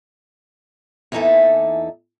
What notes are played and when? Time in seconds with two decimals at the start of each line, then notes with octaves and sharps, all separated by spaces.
1.12 E2 E3 A#3 D#4 A4 E5